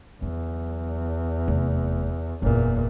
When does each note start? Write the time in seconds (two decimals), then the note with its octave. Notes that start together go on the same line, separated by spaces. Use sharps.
0.22 E2 F#3
1.48 F1
2.42 F#1 E2 A#2 F4